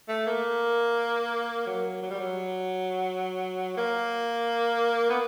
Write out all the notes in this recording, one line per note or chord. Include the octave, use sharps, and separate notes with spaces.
A3
A#3
F#3
F#3
G3
F#3
A#3
B3